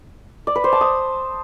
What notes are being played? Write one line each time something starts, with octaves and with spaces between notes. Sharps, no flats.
D5
B4
C5
A5
D#6